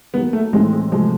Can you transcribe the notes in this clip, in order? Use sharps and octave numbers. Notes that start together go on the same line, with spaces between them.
D#3 F#3 A#3 B3
A3
A2 E3 G#3 A3 C4 D#4
G#3
C3 F3 G#3 A3